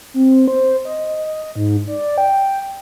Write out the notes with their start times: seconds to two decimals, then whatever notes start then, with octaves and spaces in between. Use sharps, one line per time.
0.14 C4
0.48 C5
0.85 D#5
1.56 G#2
1.88 D5
2.18 G5